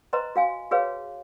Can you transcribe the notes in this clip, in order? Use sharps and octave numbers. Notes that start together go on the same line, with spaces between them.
B4 C5 D#5 A#5 C6
F#4 F5 G#5
F#4 G#4 B4 C#5 F5